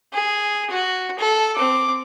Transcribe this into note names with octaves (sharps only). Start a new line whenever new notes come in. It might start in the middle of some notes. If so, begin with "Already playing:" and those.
G#4
F#4
A4
C4 D6